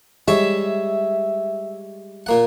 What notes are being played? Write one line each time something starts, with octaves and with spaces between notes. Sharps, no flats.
G3 G#3 C#5 E5
A#2 A#3 F#5